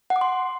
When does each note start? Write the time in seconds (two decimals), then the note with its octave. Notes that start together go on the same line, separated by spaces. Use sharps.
0.10 F#5
0.16 D6
0.21 C6